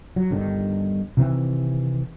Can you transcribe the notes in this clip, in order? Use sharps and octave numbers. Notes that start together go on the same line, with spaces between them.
F#3
G1 G2 D3 D#3
C3 D#3 E3 C4